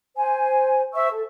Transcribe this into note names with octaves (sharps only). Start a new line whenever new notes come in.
C5 G#5
C5 E5 C#6 E6
A4